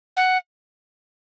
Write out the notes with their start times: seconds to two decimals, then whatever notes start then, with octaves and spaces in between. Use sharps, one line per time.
0.16 F#5